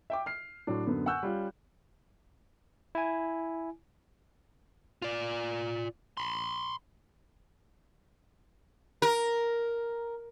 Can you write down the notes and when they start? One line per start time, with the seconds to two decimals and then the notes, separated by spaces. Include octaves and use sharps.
0.10 E5 G5 D6
0.26 F6 C7
0.67 A2 F#3 D4
0.87 F#2 D3 B3
1.06 F#5 G#5 C#6 E6 F#6 G6
1.23 G3 C#4 F4
2.95 E4 G#5
5.02 F4 D5
6.17 B5 C6
9.02 A#4